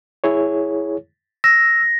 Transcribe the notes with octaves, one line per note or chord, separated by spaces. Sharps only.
E4 G#4 C#5
E6 A#6